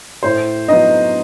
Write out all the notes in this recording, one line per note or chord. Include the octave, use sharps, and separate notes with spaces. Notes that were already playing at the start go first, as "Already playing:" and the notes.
A2 C5
F#3 B3 D#4 D#5